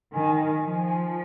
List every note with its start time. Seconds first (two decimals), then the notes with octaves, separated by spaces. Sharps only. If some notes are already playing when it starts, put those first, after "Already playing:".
0.13 D#3 G#5
0.38 G#5
0.62 F3
0.74 G#5
0.86 G#5